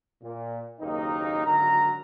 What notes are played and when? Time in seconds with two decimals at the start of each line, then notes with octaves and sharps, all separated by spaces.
0.23 A#2
0.80 F#1 D#2 A#3 C4 D#4
1.46 G#1 D3 F#3 A#4 A#5